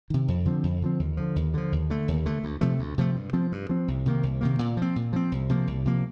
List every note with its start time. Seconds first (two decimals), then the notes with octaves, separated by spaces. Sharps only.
0.10 C3 D#3
0.28 F2
0.45 D3 F3 C4
0.63 F2
0.82 D3 F3 C4
0.99 D#2
1.17 D3 F3
1.36 D#2
1.54 D3 F3
1.72 D#2
1.90 D3 A3
2.08 D#2
2.26 D3 A3
2.43 D2
2.61 C3 F3 A3
2.79 D2
2.98 C3 F3 A3
3.16 G2
3.33 F3 C4
3.52 G2
3.69 F3 C4
3.88 C2
4.06 C3 D#3 A#3
4.23 C2
4.41 C3 D#3 A#3
4.59 A#2
4.77 F3 C4
4.96 A#2
5.13 F3 C4
5.32 C2
5.49 C3 F3 A#3
5.67 C2
5.85 C3 F3 A#3